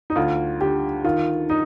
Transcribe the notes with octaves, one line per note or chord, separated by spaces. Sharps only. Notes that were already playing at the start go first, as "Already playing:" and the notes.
D#4
D2 F4
D3 G4
D#3 F4
D#4